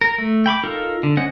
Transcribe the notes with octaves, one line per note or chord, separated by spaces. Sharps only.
A#4
A3
G5 B5 C#6 D6
D#4 F4 A4 A#4
D3
C#4 C5 D#5 F#5